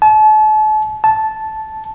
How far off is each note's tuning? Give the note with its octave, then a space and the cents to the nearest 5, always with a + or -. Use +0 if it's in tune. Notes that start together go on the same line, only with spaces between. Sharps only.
A5 -40
A5 -10